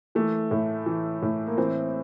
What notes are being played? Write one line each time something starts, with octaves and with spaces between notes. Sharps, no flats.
E3 A3
A2
E3
A2
A#3
E3 C4